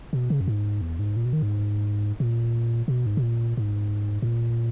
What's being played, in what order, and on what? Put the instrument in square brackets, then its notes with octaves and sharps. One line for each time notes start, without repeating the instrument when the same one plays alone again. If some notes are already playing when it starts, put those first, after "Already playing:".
[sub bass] B2
C#3
F#2
G#2
E2
G#2
A#2
B2
D#3
G#2
A#2
B2
G#2
B2
A#2
G#2
G#2
A#2